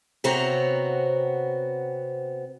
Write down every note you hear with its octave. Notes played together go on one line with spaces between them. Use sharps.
C3 B3 C4 F#4 C#5 A#5